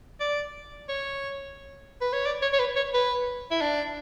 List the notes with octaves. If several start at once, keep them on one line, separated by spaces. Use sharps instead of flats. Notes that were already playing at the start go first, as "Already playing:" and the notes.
D5
C#5
B4
C#5
D5
C#5
C#5
B4
C#5
B4
E4
D4